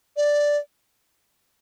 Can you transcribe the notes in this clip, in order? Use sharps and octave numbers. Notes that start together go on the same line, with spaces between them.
D5